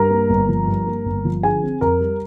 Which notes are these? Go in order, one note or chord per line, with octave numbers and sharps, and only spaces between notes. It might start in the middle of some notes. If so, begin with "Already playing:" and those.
Already playing: G2 A#4 A#5
A#3
G1
F3
G2
A#3
G1
F3
D3 G#4 G#5
C4
F2 A#4 A#5
G3